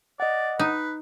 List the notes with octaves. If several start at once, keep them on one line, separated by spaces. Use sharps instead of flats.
D5 D#5 F#5
D#4 B4